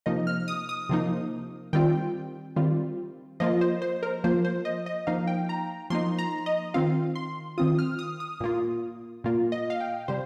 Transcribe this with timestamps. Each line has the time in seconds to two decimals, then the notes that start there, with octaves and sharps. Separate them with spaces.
0.06 C3 F3 A#3 D#4 D#5
0.27 F6
0.48 D#6
0.69 D#6
0.89 C3 F3 A#3 D#4
1.73 D#3 G3 C4 F4 G5
2.56 D#3 G3 C4 F4
3.40 F3 A#3 F4 D#5
3.61 C5
3.82 C5
4.03 A#4
4.24 F3 A#3 F4 C5
4.45 C5
4.65 D#5
4.86 D#5
5.07 F3 A#3 D#4 F5
5.27 G5
5.49 A#5
5.90 F3 A#3 D#4 C6
6.19 A#5
6.46 D#5
6.74 D#3 C4 F4 F5
7.15 C6
7.58 D#3 C4 F4 D#6
7.79 F6
7.99 D#6
8.20 D#6
8.40 A#2 A#3 F4
9.24 A#2 A#3 F4
9.52 D#5
9.70 F5
9.80 G5
10.08 C3 G3 C5